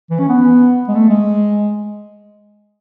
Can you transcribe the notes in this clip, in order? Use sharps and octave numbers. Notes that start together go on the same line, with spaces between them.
E3
C#4
B3
G#3
A3
G#3